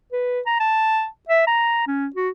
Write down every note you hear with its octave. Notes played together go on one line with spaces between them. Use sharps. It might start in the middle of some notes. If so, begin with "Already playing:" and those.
B4
A#5
A5
E5
A#5
C#4
F#4